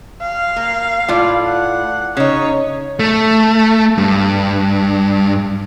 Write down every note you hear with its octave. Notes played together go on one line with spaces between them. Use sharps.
F5
A#3
A2 F4 D5
F#5
C#3 D#4 C#5
A3
G2